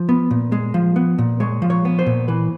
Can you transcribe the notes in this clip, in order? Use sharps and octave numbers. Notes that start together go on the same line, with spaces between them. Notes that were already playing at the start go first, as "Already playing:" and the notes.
Already playing: F3
B3
A#2
G#3
F3
B3
A#2
G#3 C#5
F3
C#5
B3
C5
A#2
E3 B4